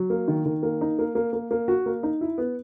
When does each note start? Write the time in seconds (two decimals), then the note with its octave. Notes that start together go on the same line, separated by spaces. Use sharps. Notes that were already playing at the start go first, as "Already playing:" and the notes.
Already playing: F#3
0.10 A#3
0.28 D#3
0.45 D#3
0.63 A#3
0.81 D#4
0.99 A#3
1.15 A#3
1.33 A#3
1.51 A#3
1.68 F#4
1.86 A#3
2.03 D#4
2.21 E4
2.38 B3